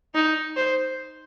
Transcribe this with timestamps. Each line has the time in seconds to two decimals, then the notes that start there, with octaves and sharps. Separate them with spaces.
0.14 D#4
0.57 C5